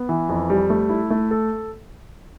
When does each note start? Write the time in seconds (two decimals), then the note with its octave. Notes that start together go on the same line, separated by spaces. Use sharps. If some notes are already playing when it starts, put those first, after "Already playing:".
Already playing: B3
0.09 E3
0.29 F2
0.50 G3
0.70 A3
0.89 E4
1.10 A3
1.31 A4